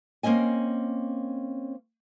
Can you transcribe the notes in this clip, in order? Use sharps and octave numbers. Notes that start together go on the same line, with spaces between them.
A#3 C4 C#4 D#5 G#5